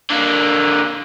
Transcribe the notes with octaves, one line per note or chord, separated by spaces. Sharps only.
D3 A#3